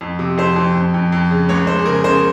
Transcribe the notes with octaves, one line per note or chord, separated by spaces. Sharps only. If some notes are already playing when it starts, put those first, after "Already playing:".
F2
C3
F2 C5
F2
F2
F2
F2
C#3
C#2 C#5
C#2 C5
G#4
C#3 A#4
C#3 C5